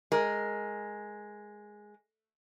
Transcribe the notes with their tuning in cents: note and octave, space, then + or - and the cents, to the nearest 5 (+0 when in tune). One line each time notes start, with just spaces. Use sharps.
G#3 +0 A#4 +0